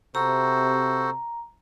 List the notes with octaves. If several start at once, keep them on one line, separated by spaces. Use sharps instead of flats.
C3 F#4 A4 C5 A#5